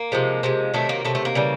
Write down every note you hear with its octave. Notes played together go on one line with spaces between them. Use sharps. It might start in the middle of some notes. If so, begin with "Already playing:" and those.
Already playing: A#3
C3 F3 G#3
C3 F3 G#3
C3 D#3 F#3 A3
A#3
C3 D#3 F#3 A3
A3
A#3
C#3 E3 G3